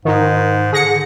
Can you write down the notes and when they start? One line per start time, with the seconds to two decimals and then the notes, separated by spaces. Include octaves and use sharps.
0.05 G#2 D#3 D#4
0.73 D3 G#4 A#6 C#7